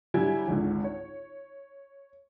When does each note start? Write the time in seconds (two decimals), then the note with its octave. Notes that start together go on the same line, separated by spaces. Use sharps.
0.14 D3 F#3 G3 E4 G#5 G#6
0.48 G#1 C#2 D3
0.84 C#5